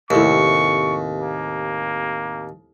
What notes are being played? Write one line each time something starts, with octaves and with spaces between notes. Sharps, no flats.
D#2 A2 C3 C4 C#6
A#3